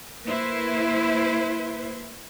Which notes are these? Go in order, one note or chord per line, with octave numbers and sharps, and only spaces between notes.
A#3 E4 B4 C5